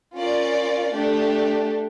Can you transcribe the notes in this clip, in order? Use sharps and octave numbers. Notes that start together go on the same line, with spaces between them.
C#4 F4 A#4 D5
A3 D4 G4